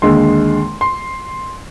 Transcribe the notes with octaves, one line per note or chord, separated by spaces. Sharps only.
D#2 D3 G#3 C6
C6